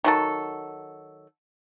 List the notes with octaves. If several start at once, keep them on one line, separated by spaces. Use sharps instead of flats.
D#3 F#3 A4